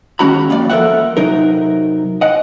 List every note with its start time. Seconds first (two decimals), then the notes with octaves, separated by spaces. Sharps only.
0.19 D#2 G#3 C#4 F#4 A#5 B5
0.50 F2 A#3 D5
0.70 F3 A4 A#4 C5 E5 F#5
1.17 C3 F#3 D#4 A#4
2.21 D#5 F#5